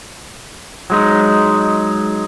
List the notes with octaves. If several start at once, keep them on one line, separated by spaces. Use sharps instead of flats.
F#3 G#3 D#4